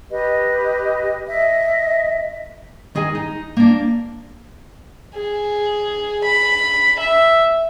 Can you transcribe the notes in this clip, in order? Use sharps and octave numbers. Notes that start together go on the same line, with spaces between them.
G4 B4 D#5
D#5 E5
D#3 G#4 D#5 G#5
D#4
A#3 D4
G#4
B5
E5